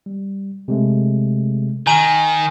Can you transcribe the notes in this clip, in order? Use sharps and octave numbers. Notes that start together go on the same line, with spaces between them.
G3
C3 G#3 A3
D#3 G#5 A#5 D#7